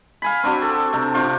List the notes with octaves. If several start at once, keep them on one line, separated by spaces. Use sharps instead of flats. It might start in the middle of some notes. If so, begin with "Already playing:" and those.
F5 G#5 B5
C4 D4 F#4
A4
C3 D4 A#5
C3 D4 F4 C#6